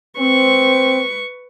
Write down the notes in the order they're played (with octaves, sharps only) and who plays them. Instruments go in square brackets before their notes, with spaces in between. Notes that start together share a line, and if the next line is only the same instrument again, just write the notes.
[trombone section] C4 [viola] B4 C#6